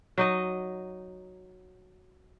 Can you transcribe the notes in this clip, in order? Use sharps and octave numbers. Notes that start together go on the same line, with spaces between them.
F#3 D#4 D#5